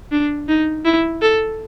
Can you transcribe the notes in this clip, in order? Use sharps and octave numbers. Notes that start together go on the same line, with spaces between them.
D4
D#4
E4
A4